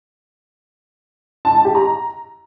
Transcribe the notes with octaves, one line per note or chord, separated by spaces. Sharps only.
A5
A5
G4
A#5